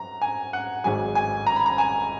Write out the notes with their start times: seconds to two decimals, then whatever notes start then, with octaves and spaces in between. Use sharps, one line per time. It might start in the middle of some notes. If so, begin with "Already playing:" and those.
Already playing: F#2 A#5
0.22 G#5
0.53 F#5
0.84 G#1 G#2 F#3 G#5
1.15 G#5
1.47 A#5
1.56 B5
1.66 A#5
1.78 G#5